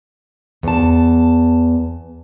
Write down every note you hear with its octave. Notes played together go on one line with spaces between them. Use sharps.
E2 A5